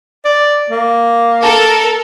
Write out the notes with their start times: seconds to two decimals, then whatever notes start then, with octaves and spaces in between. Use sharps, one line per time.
0.25 D5
0.70 A#3
1.44 A4 A#4